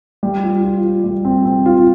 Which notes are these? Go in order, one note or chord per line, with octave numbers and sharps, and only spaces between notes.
G3
F4
F4
F4
G3
C4
C4
F4